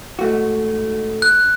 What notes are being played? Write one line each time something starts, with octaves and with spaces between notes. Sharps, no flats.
G#2 A3 F#4
F#6